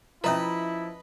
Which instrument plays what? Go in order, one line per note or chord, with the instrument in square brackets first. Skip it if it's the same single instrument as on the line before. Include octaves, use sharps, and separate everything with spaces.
[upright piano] F3 [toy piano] C#4 E5 A#5 [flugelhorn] E4 [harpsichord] B4 D#5